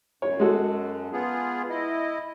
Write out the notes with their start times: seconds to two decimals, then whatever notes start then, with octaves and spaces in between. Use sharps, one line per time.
0.22 F#2 C#5
0.40 G#3 F#4 A4
1.13 B3 F4 G#4
1.70 E4 D#5